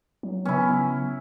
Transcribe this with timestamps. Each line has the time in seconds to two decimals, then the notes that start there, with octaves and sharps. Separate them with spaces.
0.23 F#3
0.45 C#3 B3 C#4 E4